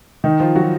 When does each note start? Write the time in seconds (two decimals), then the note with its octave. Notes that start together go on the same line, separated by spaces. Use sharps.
0.24 D#3 D#4
0.40 F3 F4
0.56 F#3 F#4